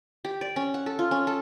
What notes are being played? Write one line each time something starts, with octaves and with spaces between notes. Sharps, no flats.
G4
D5
C#4
F#5
A4
F4
C#4
A4